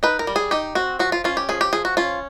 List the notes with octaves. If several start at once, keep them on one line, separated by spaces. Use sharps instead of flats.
D#4 B4
A#4
G3
G#4
D#4 G4
C4 F#4
F3 F#4
F4
C#4 F4
G4
F3 G#4
G4
F3 G#4
F#4
C#4 F4